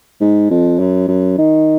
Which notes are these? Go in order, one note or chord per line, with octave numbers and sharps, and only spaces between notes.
G#2
F2
F#2
F#2
D#3